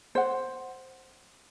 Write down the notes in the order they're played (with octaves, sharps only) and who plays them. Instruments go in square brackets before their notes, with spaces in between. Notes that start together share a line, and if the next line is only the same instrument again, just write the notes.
[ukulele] C5 F#5